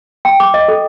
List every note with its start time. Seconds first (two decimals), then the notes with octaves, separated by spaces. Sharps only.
0.25 G5
0.40 D6
0.54 D#5
0.68 A4